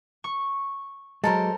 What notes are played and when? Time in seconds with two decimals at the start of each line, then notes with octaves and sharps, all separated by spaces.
0.24 C#6
1.24 F#3 G#3 A4 A#4 C5